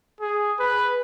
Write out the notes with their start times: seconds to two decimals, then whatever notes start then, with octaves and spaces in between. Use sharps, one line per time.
0.21 G#4
0.59 B4